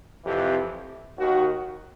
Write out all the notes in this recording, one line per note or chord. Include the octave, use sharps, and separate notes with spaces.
F2 C3 E3 G4
D#2 D#3 F#4